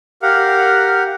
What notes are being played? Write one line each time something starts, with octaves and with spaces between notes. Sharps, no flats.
G4 A#4 F5 F#5